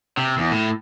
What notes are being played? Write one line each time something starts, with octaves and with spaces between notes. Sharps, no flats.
C3
E2
A2